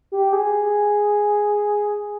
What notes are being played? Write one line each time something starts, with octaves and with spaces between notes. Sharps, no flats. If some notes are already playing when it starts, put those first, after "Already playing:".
G4
G#4